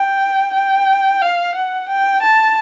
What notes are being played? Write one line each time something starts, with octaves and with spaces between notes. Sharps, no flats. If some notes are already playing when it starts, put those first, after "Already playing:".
Already playing: G5
G5
F5
F#5
G5
A5